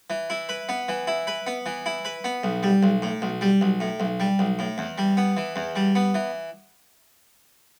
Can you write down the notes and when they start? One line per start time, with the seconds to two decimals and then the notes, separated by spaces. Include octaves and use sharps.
0.10 E3
0.30 E4
0.49 B4
0.69 B3
0.88 E3
1.07 E4
1.27 B4
1.47 B3
1.66 E3
1.86 E4
2.05 B4
2.24 B3
2.43 B1
2.63 G3
2.83 B1
3.02 A2
3.22 B1
3.41 G3
3.61 B1
3.80 A2
4.00 B1
4.20 G3
4.39 B1
4.59 A2
4.78 E2
4.98 G3
5.17 B3
5.37 E3
5.56 E2
5.76 G3
5.95 B3
6.14 E3